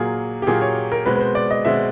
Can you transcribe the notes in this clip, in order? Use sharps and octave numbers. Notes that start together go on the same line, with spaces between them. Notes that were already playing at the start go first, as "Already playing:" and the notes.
Already playing: A#2 F#3 A#3 G#4
G4
A#2 F#3 A#3 G#4
C#5
A#4
B2 G#3 C4 B4
B4
C5
D5
D#5
B2 G#3 C4 E5